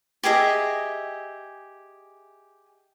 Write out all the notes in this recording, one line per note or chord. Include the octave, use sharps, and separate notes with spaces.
G4 G#4 D#5 E5